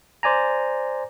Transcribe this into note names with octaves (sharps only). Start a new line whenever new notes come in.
C5 D5 G#5 A#5